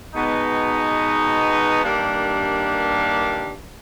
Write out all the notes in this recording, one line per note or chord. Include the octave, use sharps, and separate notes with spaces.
B2 G#3 B3 D#4
G2 D#3 G3 A#3 D4